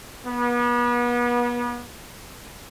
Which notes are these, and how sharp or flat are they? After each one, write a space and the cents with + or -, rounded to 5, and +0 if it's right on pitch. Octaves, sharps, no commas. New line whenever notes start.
B3 -35